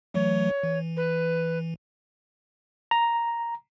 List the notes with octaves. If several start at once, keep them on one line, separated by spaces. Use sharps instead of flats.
E3 F#3 A3 C#5
E3
B4
A#5